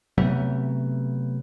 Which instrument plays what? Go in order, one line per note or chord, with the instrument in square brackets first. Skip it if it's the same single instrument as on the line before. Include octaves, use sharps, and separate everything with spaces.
[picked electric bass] C3 F#3 A3 B3